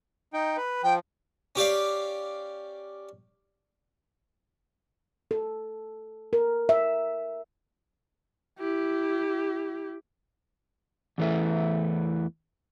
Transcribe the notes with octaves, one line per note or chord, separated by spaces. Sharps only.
D#4 G5
B4
F3 G5
C#4 G4 D5 F5
A4
A#4
E5
E4 G4
E2 E3 A3 E4